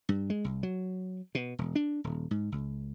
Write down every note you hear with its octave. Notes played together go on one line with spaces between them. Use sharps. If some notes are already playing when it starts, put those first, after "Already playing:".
G2
G#3
C2
F#3
B2
E1
D4
D#1
G#2
C#2